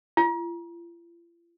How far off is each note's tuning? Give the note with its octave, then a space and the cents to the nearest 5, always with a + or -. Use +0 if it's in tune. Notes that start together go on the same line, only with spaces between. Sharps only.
F4 -45